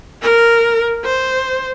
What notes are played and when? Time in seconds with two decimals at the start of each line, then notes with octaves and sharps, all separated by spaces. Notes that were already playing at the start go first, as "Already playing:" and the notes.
0.22 A#4
1.04 C5